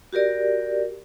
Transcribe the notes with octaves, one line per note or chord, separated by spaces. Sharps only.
F#4 G4 A#4 D5